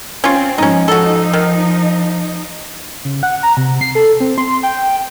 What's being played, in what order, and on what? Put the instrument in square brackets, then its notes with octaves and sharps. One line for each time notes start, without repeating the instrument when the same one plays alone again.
[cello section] C4 [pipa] C#4 F4
[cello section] G#2 F3 G#3 [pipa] C#4 D#4
[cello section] F3 D#4 [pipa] F#4 A4
[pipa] D#3
[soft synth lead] C#3
F#5
A#5
C3
C7
A4
C4
C6
G5